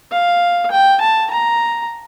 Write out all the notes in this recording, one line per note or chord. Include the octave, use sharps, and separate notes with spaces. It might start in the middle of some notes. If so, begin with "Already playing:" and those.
F5
G5
A5
A#5